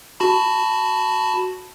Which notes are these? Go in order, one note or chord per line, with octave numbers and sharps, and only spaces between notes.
F#4 A5 B5